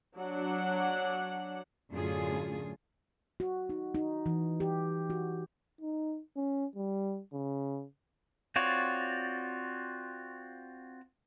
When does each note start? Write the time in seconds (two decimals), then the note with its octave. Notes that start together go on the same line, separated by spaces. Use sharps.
0.17 F#3 D4 F#5
1.92 F#2 A2 D3 F#3 F4 G#4
3.40 F#4
3.69 D#4
3.95 D#4
4.26 E3
4.60 G4
5.10 F#4
5.81 D#4
6.36 C#4
6.75 G3
7.33 C#3
8.56 C4 F4 F#4 C#5 D5